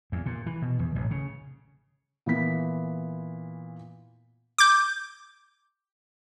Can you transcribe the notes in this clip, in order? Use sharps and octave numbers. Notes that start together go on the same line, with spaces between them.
E2
A#2
E3
B2
E2
A1
C#3
A#2 E3 B3 B6
D6 G6